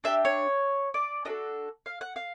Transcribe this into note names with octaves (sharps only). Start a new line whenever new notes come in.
D4 G4 E5
C#5
D5
D4 F#4 A4 D#5
F5
F#5
F5